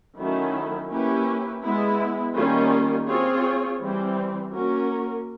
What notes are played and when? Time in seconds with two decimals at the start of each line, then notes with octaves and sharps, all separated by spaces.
0.18 D#3 F#3 A3 C#4 E4
0.91 A#3 C#4 E4 G4 B4
1.63 G#3 B3 E4
2.35 D#3 G3 A#3 C#4 F4
3.07 C4 F4 G#4 C#5
3.80 E3 G3 C4
4.53 A#3 C#4 F#4 A#4